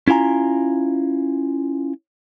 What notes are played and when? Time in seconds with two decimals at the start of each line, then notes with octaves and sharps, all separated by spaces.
0.08 C#4 E4 F4 G#5 A#5